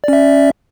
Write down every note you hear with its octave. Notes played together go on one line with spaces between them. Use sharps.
C#4 D5 E5